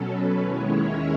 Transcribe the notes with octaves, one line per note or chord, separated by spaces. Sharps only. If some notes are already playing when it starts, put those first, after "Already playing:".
Already playing: B2 F#3 C#4 A4
B4
D#2 D#3 G#3 C#4 E4 C#5